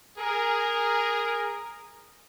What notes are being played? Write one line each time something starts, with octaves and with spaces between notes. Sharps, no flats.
G#4 A#4